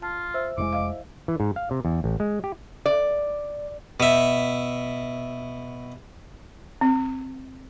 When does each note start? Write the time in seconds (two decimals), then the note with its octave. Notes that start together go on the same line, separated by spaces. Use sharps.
0.02 F4 A5
0.34 C5 E5 E6
0.58 F1 A#2 G#3 E4 D6
0.73 D#5 F5
1.28 E3
1.40 G#2
1.56 F5
1.71 C3
1.85 E2
2.04 A1
2.20 G#3
2.44 G4
2.86 D5
4.00 B2 E5
6.81 C4